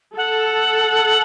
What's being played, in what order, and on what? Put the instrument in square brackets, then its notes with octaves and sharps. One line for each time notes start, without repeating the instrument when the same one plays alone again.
[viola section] A4 [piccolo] F#5